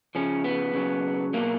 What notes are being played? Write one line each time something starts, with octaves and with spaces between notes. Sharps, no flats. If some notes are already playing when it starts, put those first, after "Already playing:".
C#3 F3 C#4
B3
C#3 F#3
B2 F#3 A#3